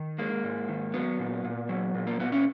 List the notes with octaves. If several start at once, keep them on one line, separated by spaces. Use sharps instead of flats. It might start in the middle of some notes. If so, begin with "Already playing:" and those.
Already playing: D#3
G#3 A#3
G#2
D#3
F#3 B3
A#2
A#2
F#3
A#2
A#3
A#2 B3
C#4